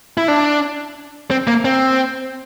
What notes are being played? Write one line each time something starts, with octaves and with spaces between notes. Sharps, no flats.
E4
D4
C4
A#3
C4